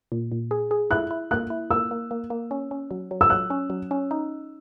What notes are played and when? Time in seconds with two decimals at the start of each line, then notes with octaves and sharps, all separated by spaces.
0.12 A#2
0.32 A#2
0.51 G#4
0.71 G#4
0.91 E4 F#6
1.11 E4
1.31 A#3 F#6
1.50 E4
1.71 A#3 E6
1.91 A#3
2.11 A#3
2.30 A#3
2.51 C#4
2.71 C#4
2.91 F#3
3.11 F#3
3.21 E6
3.30 F#3 F#6
3.50 C#4
3.70 F#3
3.91 C#4
4.11 D#4